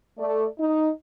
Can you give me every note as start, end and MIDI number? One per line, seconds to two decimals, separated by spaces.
0.18 0.46 57
0.18 0.46 69
0.18 0.46 74
0.59 0.90 63